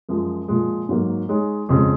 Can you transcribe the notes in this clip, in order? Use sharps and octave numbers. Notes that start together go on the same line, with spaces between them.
F#2 F3 G#3
A#2 F3 G#3
G#2 F#3 A#3
G#3 D#4 G#4 C#5
F2 C#3 G#3